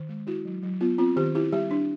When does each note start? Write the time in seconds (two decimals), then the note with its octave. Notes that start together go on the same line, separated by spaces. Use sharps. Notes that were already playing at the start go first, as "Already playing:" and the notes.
Already playing: D#3
0.09 G#3
0.27 E4 F#4
0.45 F#3
0.63 F#3
0.81 B3 F4
0.98 C4 F4
1.16 D#3 G4
1.35 E4 G4
1.53 G3 G4
1.71 D4